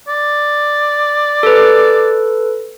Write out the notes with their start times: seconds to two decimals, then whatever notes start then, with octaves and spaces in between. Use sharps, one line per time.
0.08 D5
1.43 A4 B4